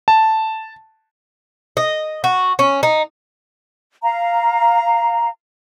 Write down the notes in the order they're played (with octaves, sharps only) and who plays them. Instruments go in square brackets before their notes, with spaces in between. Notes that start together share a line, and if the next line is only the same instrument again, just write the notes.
[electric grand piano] A5
[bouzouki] D#5
F#4
C#4
D#4
[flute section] F5 A#5